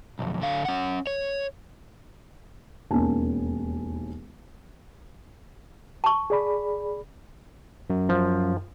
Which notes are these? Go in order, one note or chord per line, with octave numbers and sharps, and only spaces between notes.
B1 F2
D3 F5
C#4 F#5
C#5
E1 D#2 A#3 C#4 G#5 A5
A5 C#6
G#4 D5 B5
F#2
F3